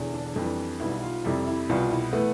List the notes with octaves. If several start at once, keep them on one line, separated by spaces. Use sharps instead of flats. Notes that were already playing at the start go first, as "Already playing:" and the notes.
Already playing: E1 E2 D3
D4
F2 E3 G3 D4
B1 B2 G3 E4
E4
F4
F2 C3 G3 E4
E4
C2 B2 G3 F4
E4
E3 A3 B3